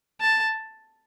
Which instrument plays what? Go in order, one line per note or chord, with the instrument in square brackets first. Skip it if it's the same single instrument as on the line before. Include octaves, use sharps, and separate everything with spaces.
[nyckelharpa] A5